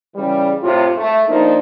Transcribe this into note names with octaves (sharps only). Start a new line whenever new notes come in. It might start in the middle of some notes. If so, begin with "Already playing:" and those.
C#3 E3 G3
A2 C3 F4
A3
F3 A#3 D4 D#4